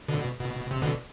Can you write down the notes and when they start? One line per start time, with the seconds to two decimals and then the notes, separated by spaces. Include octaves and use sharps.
0.08 B2 D3
0.19 B2
0.40 B2
0.71 C3
0.82 B2 D3